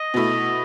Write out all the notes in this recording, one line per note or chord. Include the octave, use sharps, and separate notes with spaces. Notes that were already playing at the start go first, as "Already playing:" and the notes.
Already playing: D#5
B2 A3 E4